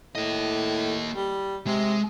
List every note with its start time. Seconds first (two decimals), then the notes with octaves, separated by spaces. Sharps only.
0.15 A2 A#3 D#5
1.14 G3
1.67 C3 G#3